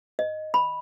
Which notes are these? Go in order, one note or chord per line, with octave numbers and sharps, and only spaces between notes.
D#5
B5